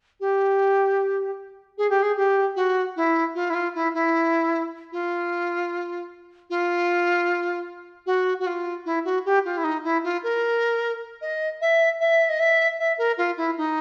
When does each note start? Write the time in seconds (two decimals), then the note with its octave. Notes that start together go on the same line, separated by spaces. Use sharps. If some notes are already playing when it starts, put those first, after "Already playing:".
0.20 G4
1.78 G#4
1.90 G4
2.02 G#4
2.17 G4
2.56 F#4
2.96 E4
3.35 F4
3.50 E4
3.54 F4
3.74 E4
3.94 E4
4.92 F4
6.50 F4
8.06 F#4
8.39 F#4
8.46 F4
8.85 E4
9.05 F#4
9.25 G4
9.45 F4
9.57 E4
9.64 D#4
9.84 E4
10.04 F4
10.23 A#4
11.21 D#5
11.61 E5
12.00 E5
12.29 D#5
12.39 E5
12.79 E5
12.98 A#4
13.17 F4
13.37 E4
13.57 D#4